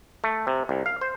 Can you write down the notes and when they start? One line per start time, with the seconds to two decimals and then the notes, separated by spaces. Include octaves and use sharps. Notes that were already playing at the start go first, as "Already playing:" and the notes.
0.24 A3
0.47 C3
0.69 C2
0.86 F5
1.01 C5